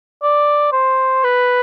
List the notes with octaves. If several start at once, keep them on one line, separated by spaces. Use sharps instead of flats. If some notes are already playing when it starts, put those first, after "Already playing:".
D5
C5
B4